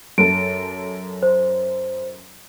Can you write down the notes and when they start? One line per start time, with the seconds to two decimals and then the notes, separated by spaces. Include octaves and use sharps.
0.18 F#2 A4 D7
1.23 C5